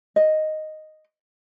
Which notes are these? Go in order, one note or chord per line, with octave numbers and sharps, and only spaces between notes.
D#5